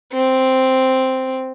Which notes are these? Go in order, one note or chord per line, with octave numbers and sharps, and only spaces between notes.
C4